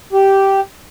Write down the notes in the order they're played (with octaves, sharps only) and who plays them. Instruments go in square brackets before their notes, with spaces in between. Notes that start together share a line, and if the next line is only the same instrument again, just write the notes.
[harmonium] G4